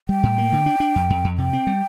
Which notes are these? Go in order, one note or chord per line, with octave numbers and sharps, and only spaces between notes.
G3 G5
A2
A#3
D3
D4
D4
F2
F2
F2
C3 G5
C4
G3